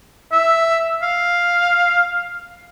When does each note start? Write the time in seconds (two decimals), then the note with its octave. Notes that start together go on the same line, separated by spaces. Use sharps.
0.32 E5
1.03 F5